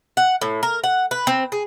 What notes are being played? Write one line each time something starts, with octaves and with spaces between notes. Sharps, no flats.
F#5
A2
A#4
F#5
B4
C4
G#4